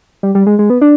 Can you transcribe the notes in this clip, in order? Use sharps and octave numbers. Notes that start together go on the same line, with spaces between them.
G3
G3
G#3
G#3
B3
D4